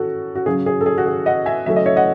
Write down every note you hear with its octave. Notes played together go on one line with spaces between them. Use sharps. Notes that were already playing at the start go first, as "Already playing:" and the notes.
Already playing: C#4 F#4 A4
F#4
C#3 F#3 C#4 G#4
G#4
A4
G#4
F#4
G#4
D#5 F#5
E5 G#5
C#3 F#3 A3 C#4 E5
D#5
C#5 E5
D#5 F#5